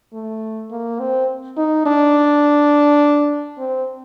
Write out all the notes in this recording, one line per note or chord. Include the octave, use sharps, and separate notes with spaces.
A3
A#3
C4
D#4
D4
C4